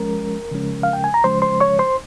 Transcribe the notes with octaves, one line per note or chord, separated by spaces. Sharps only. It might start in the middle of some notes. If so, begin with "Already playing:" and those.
Already playing: F3 G#3 C#4 A#4
C#3 F3 G#3 C#4
F5
G5
G#5
A#5
C#3 F3 G#3 C#4 C5 C6
C5 C6
C#5 C#6
C5 C6